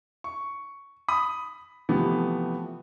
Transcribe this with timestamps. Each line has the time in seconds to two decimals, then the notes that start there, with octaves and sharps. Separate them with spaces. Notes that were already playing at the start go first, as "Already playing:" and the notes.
0.24 C#6
1.08 B5 D#6
1.89 C3 E3 F3 A3 B3